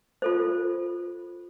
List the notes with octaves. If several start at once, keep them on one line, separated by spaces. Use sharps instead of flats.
F4 A4 C5